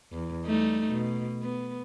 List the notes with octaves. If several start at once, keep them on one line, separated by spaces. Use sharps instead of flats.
E2
G3 A3 D#4
B2
B3